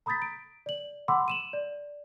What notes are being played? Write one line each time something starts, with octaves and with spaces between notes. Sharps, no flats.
A#5 B5 D#6 G6 A6 B6
D7
D5 F#7
F#5 B5 C6 D6 E6
D#7 E7 F#7
D5